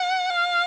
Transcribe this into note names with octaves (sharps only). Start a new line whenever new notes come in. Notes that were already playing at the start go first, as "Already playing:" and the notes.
Already playing: F#5
F5